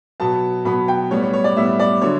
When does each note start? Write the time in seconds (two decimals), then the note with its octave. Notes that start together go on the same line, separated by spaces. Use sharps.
0.20 B2 F#3 B3 A5
0.65 B2 F#3 B3 B5
0.88 G5
1.11 A2 G3 B3 C#5
1.22 C#5
1.33 C#5
1.44 D5
1.56 A2 G3 B3 E5
1.79 D5
2.02 D3 F#3 C#5